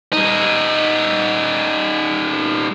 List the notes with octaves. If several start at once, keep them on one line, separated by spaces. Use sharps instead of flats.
G3 D#4